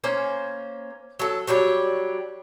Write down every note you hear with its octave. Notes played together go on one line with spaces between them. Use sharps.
A#3 C#4 C5
F#3 A4
F#3 G3 D4 C#5